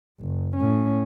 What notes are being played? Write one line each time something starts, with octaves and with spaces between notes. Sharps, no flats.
F#1
A2 C#4